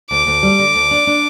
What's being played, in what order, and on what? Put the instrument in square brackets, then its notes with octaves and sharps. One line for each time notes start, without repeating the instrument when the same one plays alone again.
[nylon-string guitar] D2 [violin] D6
[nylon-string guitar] D2
G3
D3
D2
D4
D4